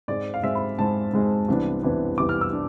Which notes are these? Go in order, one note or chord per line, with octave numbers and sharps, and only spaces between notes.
G#2 G#3 C4 D5
F5
G#2 G#3 C4 E5
B5
G#2 G#3 C4 A5
G#2 G#3 C4
C2 C3 E3 B3 D4
C2 C3 E3 B3 D4
C2 C3 E3 B3 D4 D6
F6
E6
D4